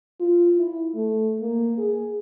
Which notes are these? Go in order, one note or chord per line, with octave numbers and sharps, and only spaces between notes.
F4
E4
A3
A#3
G#4